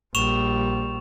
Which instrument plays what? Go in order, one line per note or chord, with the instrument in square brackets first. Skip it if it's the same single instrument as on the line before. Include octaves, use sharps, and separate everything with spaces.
[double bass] A#1 G3 [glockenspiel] C#6 E7 F7